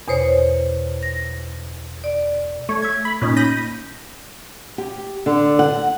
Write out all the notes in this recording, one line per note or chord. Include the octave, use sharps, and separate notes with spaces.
E2 B2 C5 C#5
A#6
D5
A3 C#5
E5 G#6
B5
A#2 C#4 D#4
B5 G6 A#6 D#7
G4
D3
F#5